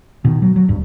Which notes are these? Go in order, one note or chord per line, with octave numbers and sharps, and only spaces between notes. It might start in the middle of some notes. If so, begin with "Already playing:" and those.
B2 D#3
F#3
F#3
D1 G2